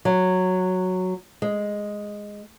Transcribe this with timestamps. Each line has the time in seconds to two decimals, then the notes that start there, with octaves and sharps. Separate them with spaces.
0.05 F#3
1.42 G#3